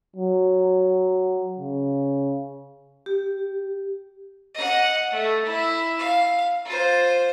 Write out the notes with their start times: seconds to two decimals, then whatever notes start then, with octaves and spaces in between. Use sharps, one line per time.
0.16 F#3
1.59 C#3
3.06 G4
4.54 D#5 F#5
5.11 A3
5.45 E4
5.99 F5
6.65 F4 C5